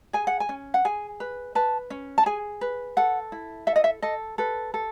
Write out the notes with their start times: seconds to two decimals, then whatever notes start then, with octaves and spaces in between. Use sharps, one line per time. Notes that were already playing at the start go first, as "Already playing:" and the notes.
0.13 G#4 G#5
0.27 F#5
0.40 G#5
0.49 C#4
0.74 F#5
0.85 G#4 G#5
1.20 B4
1.55 B4 A5
1.90 C#4
2.18 A5
2.26 G#4 G#5
2.61 B4
2.97 A4 F#5
3.32 E4
3.67 A4 E5
3.76 D#5
3.84 E5
4.02 A4 D#5
4.38 A4 B4
4.74 A4